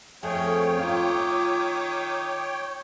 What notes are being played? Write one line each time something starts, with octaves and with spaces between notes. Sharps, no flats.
F2 A3 C#4 G#4 C#5 G5
D#3 F4 D6